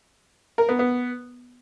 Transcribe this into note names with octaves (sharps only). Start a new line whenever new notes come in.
A#4
B3
B3